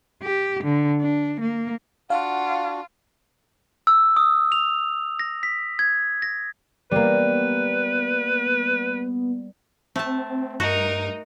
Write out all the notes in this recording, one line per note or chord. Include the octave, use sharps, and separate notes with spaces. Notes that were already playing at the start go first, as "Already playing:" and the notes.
G4
D3
D4
A#3
D4 F4 F#4 F5 F#5
E6
D#6
F7
A#6
B6
G#6
A#6
G3 A#3 B3 B4
A3 C4 A5
G2 D#4 F#4 A#4